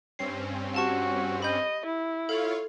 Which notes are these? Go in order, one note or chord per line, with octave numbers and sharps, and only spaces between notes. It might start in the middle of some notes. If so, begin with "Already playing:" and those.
G2 C4 C#4 C7
F#4 G4 A5 C#6
D#5 B5 G6
E4
F4 A4 C#5 F5